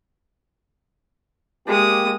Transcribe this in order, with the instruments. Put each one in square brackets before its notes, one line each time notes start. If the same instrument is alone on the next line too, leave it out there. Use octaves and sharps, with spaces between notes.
[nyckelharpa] G#3 D#6 [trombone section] A#3 G4